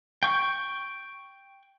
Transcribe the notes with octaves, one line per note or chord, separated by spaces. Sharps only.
G5 C#6